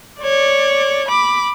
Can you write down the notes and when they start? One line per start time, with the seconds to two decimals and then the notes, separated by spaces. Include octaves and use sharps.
0.22 C#5 D5
1.08 B5 D6